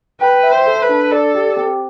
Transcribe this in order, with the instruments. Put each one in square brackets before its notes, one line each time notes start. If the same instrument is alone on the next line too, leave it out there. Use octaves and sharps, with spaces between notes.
[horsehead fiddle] B4 [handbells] G5
[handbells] E5
[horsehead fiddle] C5
[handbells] A4
[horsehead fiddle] B4
[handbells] D4
[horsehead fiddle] A4 [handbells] D5
[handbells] G4
C4